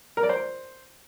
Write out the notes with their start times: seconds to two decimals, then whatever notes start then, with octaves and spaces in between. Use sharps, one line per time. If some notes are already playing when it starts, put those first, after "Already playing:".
0.17 A#4
0.23 D5
0.29 C5